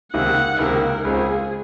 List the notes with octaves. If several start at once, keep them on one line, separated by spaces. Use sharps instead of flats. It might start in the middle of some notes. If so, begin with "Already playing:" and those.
C#2 C3 D#3 A#3 F#5
C#2 C3 D#3 A#3 A#4
C#2 C#3 G#3 C4 F4 G#4